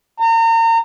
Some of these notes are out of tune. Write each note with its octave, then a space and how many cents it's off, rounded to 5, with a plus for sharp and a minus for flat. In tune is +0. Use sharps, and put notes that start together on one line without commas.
A#5 -35